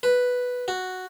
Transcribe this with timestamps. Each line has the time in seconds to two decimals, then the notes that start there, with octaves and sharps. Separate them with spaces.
0.03 B4
0.68 F#4